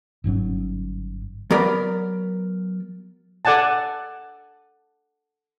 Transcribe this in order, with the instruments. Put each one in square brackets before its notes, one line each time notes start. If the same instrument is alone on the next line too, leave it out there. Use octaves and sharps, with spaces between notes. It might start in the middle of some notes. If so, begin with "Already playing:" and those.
[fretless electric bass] G1 G#2 F#3 C#4
[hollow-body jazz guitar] F#3 B3 A#4 D5 B5
[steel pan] A4 D5 F#5 G#5 A5